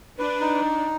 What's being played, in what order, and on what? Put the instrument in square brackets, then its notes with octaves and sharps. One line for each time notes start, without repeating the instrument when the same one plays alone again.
[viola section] D4 [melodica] B4
[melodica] D#4